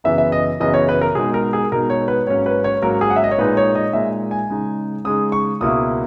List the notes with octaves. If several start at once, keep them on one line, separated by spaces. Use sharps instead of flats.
F#2 C#3 E3 B3 E5
E5
D#5
F#2 C#3 E3 B3 D#5
C#5
B4
A#4
B2 G#3 D#4 G#4
A#4
G#4
B2 G#3 D#4 A#4
C#5
B4
G#2 F#3 A#3 C#4 C#5
B4
C#5
G#2 F#3 A#3 C#4 A#4
G#4
F#5
E5
D#5
C#5
A#2 G#3 D#4 B4
C#5
D#5
A#2 G#3 D#4 E5
G#5
C#3 G#3 D#4
C#3 G#3 D#4 D#6
C#6
C#2 B2 A#3 E4 D#6